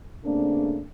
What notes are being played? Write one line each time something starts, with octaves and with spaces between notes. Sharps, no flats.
C#3 A3 A#3 C4 D4